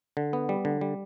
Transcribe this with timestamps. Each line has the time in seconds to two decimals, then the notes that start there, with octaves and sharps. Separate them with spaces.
0.17 D3
0.33 B3
0.49 G3
0.65 D3
0.81 G3